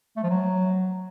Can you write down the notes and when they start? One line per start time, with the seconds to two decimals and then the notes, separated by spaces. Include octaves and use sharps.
0.16 A3
0.23 F3
0.30 F#3